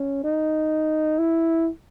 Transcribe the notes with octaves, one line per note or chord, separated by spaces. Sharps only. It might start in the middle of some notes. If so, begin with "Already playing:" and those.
Already playing: C#4
D#4
E4